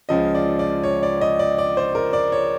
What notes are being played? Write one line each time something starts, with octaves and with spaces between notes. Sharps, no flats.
C#2 C#3 F3 D#5
D5
D5
C#5
D5
D#5
D5
D5
C5
A#4
D5
C#5